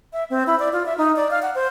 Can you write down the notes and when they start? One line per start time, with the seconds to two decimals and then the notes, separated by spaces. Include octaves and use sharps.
0.13 E5
0.30 C4
0.47 E4
0.59 D5
0.73 F4
0.86 E5
0.98 D#4
1.16 D5
1.31 F5
1.42 F#5
1.55 C5